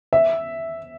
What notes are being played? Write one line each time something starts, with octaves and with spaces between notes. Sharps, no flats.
E5